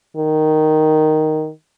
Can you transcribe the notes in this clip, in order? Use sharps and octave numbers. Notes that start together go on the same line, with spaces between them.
D#3